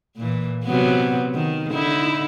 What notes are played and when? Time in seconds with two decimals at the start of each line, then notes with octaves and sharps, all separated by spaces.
0.17 A#2 E3
0.64 C3 F#3 B3
1.34 D#3
1.71 D3 D#4 E4